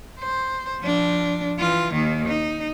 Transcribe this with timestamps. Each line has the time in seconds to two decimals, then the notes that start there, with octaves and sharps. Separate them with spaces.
0.19 C5
0.81 F3 D4
1.59 E3 F4
1.94 D#2 D#3
2.28 D#4